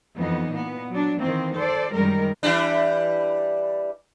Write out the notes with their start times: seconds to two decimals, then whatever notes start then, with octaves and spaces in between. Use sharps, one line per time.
0.16 F2 E3 B3 D#4
0.49 A#2 B3
0.92 F#3 D4
1.21 D#3 E3 A#3 C4
1.55 A4 C5 D5
1.94 F#2 D#3 G3 G#3 A#4
2.43 E3 G3 D4